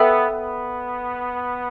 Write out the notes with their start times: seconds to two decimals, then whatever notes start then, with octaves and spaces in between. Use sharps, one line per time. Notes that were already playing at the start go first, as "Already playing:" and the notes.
Already playing: B3 A4 E5 G5 E6
0.29 B3